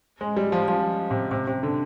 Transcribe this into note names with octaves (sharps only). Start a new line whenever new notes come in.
G#3
G3
F3
F3
C3
C3
C3
D3